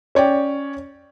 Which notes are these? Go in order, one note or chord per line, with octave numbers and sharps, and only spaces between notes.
C#4 C#5 D5 G5